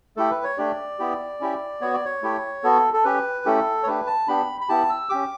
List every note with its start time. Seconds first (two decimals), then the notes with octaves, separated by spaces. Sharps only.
0.17 A3 E4 G4 A4
0.30 B4
0.44 C#5
0.58 A3 D4 G4 D5
0.99 B3 E4 G4
1.40 C#4 E4 G4
1.81 B3 F#4 C#5
1.93 D5
2.05 C#5
2.23 A3 E4 G4
2.64 B3 F#4 A4
2.93 A4
3.05 C#4 G4 B4
3.45 A3 C#4 E4 G4 A4
3.83 C#5
3.86 A3 D4 G4 B4
4.07 A5
4.28 B3 D4 G4 B5
4.61 B5
4.69 B3 E4 G4 A5
4.90 E6
5.09 C#4 G4 D6